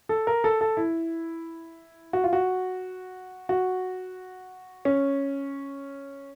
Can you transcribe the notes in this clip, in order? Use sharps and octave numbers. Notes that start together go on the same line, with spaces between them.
A4
A#4
A4
A4
E4
F#4
F4
F#4
F#4
C#4